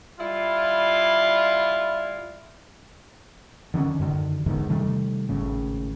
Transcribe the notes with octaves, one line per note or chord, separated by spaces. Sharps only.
G3 E4 F4
D3 D#3 G3 C#4
F#2 D3 D#3
E2 G#2 D3 D#3
C3 D#3 G3 A3
G#1 A2 C#3